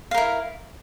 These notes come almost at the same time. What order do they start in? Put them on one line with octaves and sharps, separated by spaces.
F5 A#4 E4